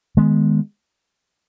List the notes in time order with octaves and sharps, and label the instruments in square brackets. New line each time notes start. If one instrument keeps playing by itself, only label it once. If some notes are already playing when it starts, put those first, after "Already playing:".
[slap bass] D#3 G#3 B3